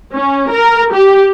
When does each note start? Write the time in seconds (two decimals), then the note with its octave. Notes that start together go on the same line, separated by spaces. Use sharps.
0.13 C#4
0.50 A#4
0.93 G4